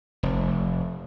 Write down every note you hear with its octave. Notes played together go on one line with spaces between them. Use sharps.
F1